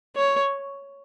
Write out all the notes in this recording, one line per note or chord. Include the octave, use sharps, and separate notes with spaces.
C#5